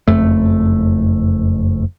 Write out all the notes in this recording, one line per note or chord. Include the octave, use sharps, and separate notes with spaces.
F#1 F2 A3